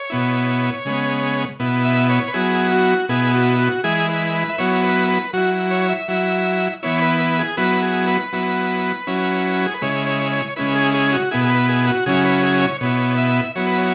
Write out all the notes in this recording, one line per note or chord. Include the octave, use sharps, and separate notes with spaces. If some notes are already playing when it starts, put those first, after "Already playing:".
Already playing: C#5
B2 B3 E4
C#3 G#3 B3
B2 B3 E4
E5
C#5
B4
F#3 B3 E4 G#4
F#4
B2 B3 E4 G#4
F#4
F#4
E3 G#3 E4 G#4
B4
B4
E5
F#3 B3 E4 C#5
B4
B4
F#3 E4 F#4
C#5
E5
F#3 E4
E3 B3 E4 C#5
B4
B4
G#4
F#3 B3 E4 B4
G#4
B4
F#3 B3 E4
F#3 C#4 E4
G#4
B4
C#3 G#3 E4 C#5
C#5
C#5
C#3 G#3 C#4 E4 B4
G#4
G#4
F#4
B2 B3 E4 G#4
G#4
B4
G#4
F#4
C#3 F#3 C#4 E4 G#4
B4
G#4
C#5
B2 B3 E4 C#5
E5
F#3 B3 E4 C#5
B4
C#5